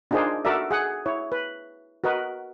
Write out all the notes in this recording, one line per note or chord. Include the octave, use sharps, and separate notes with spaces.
D4 D#4 F4 G#4 A#4 C5
F#4 A4 A#4 D5 E5
G#4 F#5
E4 C#5
B4
F#4 A#4 B4 D#5